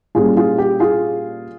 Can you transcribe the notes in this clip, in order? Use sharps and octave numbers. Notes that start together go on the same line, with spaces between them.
A#2 G3 C#4 F4 G#4
F4 G#4
G4
F4 G#4